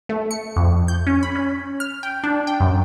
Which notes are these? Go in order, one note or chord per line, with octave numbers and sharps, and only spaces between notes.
A3
C#7
F2
G6
C#4
B5
C#4
F6
G5
D4
G5
F#2